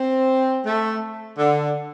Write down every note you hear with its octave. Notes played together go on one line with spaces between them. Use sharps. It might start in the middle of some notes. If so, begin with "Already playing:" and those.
Already playing: C4
A3
D3